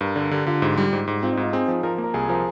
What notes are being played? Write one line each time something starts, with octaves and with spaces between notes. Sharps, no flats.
G2 A#4
D3 A#4
D3 G4
D3 F4
G#2 G4
G3
G#2
G#2
C4 F4
D#4
G#2
F4
C4 G#4
F3
F3 A#4
A#3
A#4
C2 G#4
F3 A#4